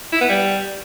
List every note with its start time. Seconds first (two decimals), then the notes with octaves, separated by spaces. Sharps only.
0.13 E4
0.21 B3
0.29 G3